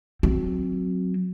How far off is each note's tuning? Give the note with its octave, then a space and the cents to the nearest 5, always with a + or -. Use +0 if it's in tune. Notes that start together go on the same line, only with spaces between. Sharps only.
F#3 -10 C4 +5